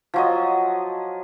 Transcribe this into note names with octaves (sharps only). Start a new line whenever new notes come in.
F3 F#3 D#5